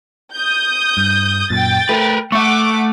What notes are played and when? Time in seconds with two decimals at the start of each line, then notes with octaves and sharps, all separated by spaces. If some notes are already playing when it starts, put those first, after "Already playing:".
0.33 D#6 G6
0.97 G2
1.50 F#2 A#2 G5 A6
1.89 A3 A#4 B4
2.32 A3 E5 F#5 C#6 D6